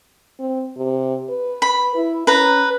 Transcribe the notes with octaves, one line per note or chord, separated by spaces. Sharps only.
C4
C3
B4
B5
E4
C#4 B4 A#5